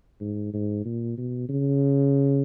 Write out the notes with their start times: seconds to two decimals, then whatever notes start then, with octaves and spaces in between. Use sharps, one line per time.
0.21 G#2
0.54 G#2
0.85 A#2
1.18 B2
1.49 C#3